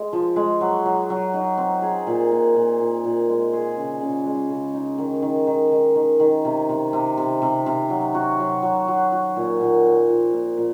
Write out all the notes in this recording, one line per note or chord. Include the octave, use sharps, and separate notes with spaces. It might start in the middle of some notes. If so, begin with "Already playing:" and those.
Already playing: G#3
F3
G#3
F#3
F#3
F#3
D#4
C4
G#4
A#2
A#2
A#2
A#2
A#2
G#3
G#4
C#3
C#3
G#3
C#3
D#4
D#3
D#3
D#3
D#3
D#3
D#3
C3
C3
C3
C3
C3
C3
F#3
F#4
F#3
F#3
F#3
F#4
A#2
A#2
C4
F3
A#2
A#2